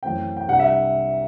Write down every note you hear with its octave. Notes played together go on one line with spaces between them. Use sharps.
F#2 E3 A3 C4 G5
G5
C2 C3 G3 D4 F#5
E5